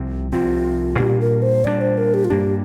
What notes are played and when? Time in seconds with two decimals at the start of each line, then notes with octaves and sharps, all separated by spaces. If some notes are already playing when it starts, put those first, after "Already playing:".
Already playing: C2 C3 F3 C4
0.32 C2 C3 F3 C4 F4
0.98 A#2 G3 A#3 D4 G4
1.21 A#4
1.42 C5
1.64 A#2 G3 A#3 D4 D5
1.81 C5
1.97 A#4
2.14 G4
2.25 F4
2.30 G2 G3 A#3 D4 G4